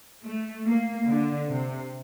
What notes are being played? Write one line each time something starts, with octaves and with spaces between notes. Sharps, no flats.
A3
A#3
D3
C3